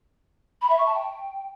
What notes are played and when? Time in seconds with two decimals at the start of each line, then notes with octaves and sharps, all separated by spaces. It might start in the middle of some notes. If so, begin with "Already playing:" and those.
0.61 B5
0.70 E5
0.78 C#6
0.86 A5
0.94 G5